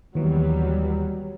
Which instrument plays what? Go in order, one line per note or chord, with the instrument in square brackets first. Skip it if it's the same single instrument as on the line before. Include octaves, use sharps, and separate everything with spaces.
[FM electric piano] D#2 E3 [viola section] F#3 G3 B3